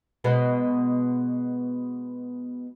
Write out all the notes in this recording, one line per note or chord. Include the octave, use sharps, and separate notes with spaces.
B2 G#3 B3